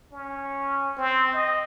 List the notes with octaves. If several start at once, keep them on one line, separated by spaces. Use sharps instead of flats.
C#4
C4
D#5